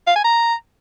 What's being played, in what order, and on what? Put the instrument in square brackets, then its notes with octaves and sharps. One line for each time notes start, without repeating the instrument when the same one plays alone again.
[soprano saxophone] F5
G#5
A#5